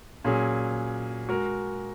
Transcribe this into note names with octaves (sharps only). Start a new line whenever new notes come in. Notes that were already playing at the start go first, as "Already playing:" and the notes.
A#2 F#3 C#4 G#4
G#3 F#4 A#4